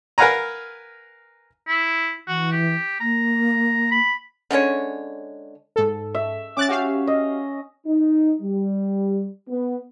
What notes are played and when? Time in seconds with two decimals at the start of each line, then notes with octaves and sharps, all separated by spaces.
0.18 A#4 B4 F5 F#5 G#5 A#5
1.68 E4
2.28 E3 F#4
2.52 G4
3.01 A#3 A#5
3.91 B5
4.51 D3 G#3 C#4 C#5
5.76 G#2 A4
6.14 E5
6.57 C#4 D6 F#6 A6
6.69 F#4 G4 F5
7.07 D#5
7.86 D#4
8.42 G3
9.49 B3